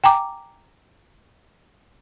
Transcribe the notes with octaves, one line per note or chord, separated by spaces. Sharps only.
G5 G#5 A#5 D6